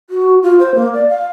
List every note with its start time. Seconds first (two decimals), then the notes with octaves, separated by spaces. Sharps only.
0.10 F#4
0.43 F4
0.59 C5
0.75 A#3
0.93 D5
1.09 F5